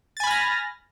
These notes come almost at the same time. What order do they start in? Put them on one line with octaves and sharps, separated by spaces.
A6 G#5 B5 F6 A#6